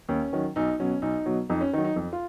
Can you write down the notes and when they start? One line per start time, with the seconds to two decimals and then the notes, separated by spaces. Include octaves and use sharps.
0.09 D#2 C#4
0.33 D#3 F#3
0.56 B1 D#4
0.80 B2 F#3 C#4
1.02 B1 D#4
1.26 B2 F#3
1.50 F2 D#4
1.61 C#4
1.73 D#3 D#4
1.77 F#3
1.85 D#4
1.96 F2
2.13 F4